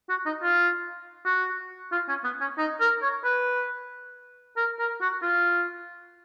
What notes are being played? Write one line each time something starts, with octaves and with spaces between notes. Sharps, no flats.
F#4
D#4
F4
F#4
F4
C#4
B3
C#4
D#4
A#4
C#5
B4
A#4
A#4
F#4
F4